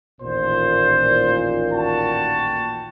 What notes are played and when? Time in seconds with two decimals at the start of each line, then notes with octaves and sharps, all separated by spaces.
0.21 A1 D#2 A#2 C5
1.72 F#4 G5 A5